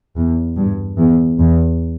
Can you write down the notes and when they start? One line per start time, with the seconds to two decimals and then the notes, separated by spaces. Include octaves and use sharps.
0.16 E2
0.56 G2
0.98 E2
1.38 E2